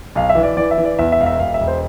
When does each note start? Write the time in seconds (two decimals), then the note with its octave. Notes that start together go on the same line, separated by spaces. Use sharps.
0.15 B1 F5
0.29 E5
0.35 E3
0.43 D5
0.57 E3 D5
0.71 E5
0.78 E3
0.85 D5
0.99 E2 E5
1.12 E5
1.20 E1 F5
1.26 E5
1.39 E1 F5
1.54 E5
1.60 E1
1.68 C5